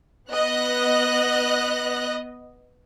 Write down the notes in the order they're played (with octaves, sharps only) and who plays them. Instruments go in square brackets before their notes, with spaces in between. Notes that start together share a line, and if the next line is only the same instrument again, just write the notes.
[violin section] B3 D#5 F#6 A#6